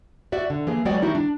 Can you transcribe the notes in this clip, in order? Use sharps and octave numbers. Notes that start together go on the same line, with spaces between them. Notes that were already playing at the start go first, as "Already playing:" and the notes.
F#4 D5 E5
D3
E3 A#3 G#4
F#3 G#3 B3 F#4 D5 G5
D#3 G3 D#4 E4 F#4
D4